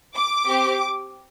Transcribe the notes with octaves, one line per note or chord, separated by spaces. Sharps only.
D6
C4 G4